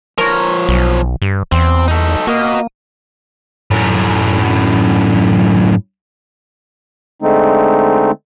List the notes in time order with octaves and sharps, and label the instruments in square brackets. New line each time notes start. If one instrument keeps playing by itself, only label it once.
[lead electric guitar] F3 C#5 [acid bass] A#4
[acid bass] B1
G2
[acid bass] E2 [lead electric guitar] C4
[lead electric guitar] D#4 A4
[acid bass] A#3 [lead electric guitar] F#4 D#5
[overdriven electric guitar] F#2 A2
[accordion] D3 G#3 A3 C4 D#4